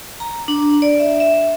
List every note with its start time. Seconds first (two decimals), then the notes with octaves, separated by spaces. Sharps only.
0.20 A#5
0.48 D4
0.82 D5
1.00 E5
1.20 E5